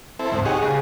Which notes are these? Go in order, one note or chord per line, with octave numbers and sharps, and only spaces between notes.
C4 E4 A4
D2 G#2 C4
D#4 G4 G#4 C#5 F#5
C#3 G#4